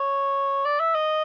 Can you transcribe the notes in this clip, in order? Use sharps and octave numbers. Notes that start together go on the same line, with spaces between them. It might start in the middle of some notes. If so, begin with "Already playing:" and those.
Already playing: C#5
D5
E5
D#5